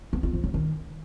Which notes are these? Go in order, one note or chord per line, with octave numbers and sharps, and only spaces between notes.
B3
F4
F3
F#3
D#3